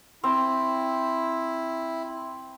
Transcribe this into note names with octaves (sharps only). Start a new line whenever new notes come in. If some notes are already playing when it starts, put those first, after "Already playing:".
C4 E4